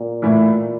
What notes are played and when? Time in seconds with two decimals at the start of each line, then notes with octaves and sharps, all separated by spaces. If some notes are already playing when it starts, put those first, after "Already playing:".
Already playing: A#2
0.22 A2 E3 A3 E4